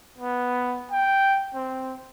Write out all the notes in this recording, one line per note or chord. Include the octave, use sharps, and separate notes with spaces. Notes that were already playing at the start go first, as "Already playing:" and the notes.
B3
G5
C4